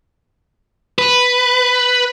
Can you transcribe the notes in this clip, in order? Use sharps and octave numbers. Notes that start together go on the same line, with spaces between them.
B4